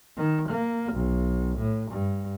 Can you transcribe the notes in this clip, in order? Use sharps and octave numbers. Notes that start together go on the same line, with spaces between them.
D#3
A#3
B1
A2
G2